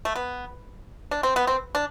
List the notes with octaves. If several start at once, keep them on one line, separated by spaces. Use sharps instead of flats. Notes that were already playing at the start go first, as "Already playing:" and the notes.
A3
B3
D4
C4
B3
C4
D4